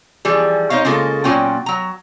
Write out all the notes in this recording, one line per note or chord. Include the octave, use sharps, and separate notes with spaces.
E3 F3 G3 G#4
C4 D#4 C#5 D#5 F5
C#3 G#3 A#3 F4 G#4 A4
A#2 F#3 A#3 C#4 F4 G5
F#3 A#5